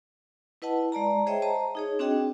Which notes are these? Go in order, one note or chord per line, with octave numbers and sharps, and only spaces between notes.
E4 B4 D#5 F#5 A5
G#3 D5 A5 A#5
G#4 C5 C#5 D#5 E5 G5
C5 D#5 A5 A#5
D#4 G#4 C#5
C4 D4 F#4 G#4 D#5 G5